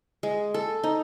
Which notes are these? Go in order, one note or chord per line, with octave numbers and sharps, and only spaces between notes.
G#3
A4
D#4